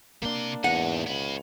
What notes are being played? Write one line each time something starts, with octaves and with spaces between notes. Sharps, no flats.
C3 A#3 D4 C6
E2 G#2 D#4 F#5
C#2 C#5 B5